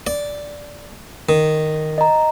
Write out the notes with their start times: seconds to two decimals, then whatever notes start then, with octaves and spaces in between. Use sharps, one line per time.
0.07 D5
1.29 D#3
1.98 D#5 A#5